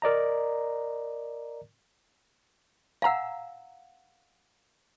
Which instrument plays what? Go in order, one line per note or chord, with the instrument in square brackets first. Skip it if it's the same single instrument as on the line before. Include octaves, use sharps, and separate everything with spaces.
[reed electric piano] A#4 D5 D#5 A#5
[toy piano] F5 F#5 [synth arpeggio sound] G#5 A#5 E6